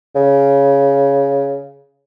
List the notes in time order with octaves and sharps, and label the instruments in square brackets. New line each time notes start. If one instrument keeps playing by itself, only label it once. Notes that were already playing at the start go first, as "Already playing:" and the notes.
[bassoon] C#3